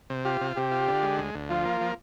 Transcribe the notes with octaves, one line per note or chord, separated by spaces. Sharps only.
C3
F4 G4
C3
C3 G4
F4
D3
G#3
D2
D2
F3 F4
A#3
F3